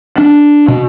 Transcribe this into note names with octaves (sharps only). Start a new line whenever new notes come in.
D4
B2